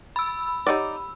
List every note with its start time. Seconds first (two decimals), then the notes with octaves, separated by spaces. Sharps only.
0.16 B5 E6
0.67 D#4 G4 C#5 D5 F#5